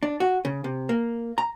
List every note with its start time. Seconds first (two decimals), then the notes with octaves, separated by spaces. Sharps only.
0.03 D4
0.20 F#4
0.45 C#3
0.64 C3
0.89 A#3
1.38 A#5